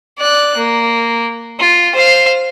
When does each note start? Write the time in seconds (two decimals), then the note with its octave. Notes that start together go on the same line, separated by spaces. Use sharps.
0.19 D5 F#6
0.57 A#3
1.59 F4
1.95 C5 F5